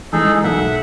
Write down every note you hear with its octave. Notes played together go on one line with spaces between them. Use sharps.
E3 G#3 D#4 G#4 A4
B1 E5 F#5